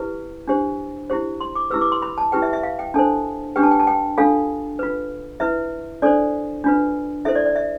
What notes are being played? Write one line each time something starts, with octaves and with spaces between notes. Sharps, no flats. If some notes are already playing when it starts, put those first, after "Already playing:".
Already playing: E4 G4 B4
D4 G4 C5
E4 G4 C5
C6
D6
E4 G4 B4 E6
D6
C6
B5
A5
E4 G4 B4 G5
E5
E5
F5
G5
D4 A4 C5 A5
D4 G4 B4 G5
A5
G5
A5
G5
D4 F4 A4 F5
F4 B4
E4 B4 E5
D4 A4 C5 D5
D4 F4 B4
E4 A4 C5 E5
D5
D5
E5